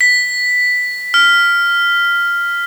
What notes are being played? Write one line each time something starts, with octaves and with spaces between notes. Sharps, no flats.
B6
F6